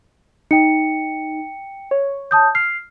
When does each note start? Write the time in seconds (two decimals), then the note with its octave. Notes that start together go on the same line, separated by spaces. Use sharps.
0.51 D#4 G5 C#7
1.91 C#5
2.31 A5 D#6 G6
2.55 F6 C7